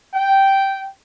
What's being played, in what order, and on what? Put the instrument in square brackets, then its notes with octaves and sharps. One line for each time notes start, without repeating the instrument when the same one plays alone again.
[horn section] G5